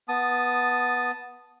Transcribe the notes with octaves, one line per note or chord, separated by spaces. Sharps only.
B3 A5 D#6